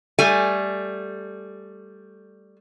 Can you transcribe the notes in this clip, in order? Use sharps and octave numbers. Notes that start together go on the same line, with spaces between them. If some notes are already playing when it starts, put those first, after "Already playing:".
G3 A3 G#5